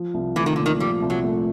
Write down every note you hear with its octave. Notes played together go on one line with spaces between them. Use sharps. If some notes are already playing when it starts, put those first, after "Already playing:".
Already playing: F3
C2
E3 A3
D#3
A#2 D3
D#3
F3 G3
C2
F#3
A3